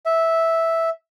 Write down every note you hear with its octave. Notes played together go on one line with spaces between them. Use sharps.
E5